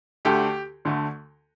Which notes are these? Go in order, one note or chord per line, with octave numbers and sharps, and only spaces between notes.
D2 D3 A3 G4
D2 D3 A3